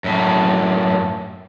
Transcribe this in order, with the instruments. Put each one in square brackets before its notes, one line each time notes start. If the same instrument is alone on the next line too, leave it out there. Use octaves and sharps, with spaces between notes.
[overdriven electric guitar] F#2 A2